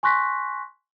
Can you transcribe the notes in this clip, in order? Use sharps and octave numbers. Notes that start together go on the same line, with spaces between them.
G#5 C6 C#6 F#6 A#6 B6